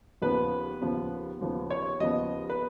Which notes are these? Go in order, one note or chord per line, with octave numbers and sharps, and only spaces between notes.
D#2 C#3 F3 B3 B4
D#2 C#3 F3 B3
D#2 C#3 F3 B3
C#5
D#2 C#3 F3 B3 D#5
B4